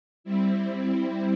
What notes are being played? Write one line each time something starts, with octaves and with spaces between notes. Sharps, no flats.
G3 C4 E4